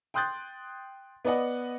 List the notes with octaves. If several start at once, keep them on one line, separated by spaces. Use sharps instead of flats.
G5 C6 D#6 F#6 G6 A6
B3 B4 D5 D#5 F#5